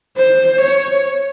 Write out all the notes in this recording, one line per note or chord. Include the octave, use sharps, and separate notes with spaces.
C5
C#5